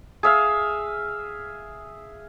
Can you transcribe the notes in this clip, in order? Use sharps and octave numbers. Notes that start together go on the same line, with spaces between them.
G#4 E5 F5